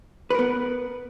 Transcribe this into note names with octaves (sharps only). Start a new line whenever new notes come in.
B3 A#4 B4